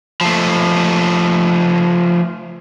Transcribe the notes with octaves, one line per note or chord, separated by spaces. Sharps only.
F3 A3